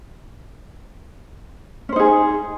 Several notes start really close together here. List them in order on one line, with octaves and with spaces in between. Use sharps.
C#4 C5 D#4 G#4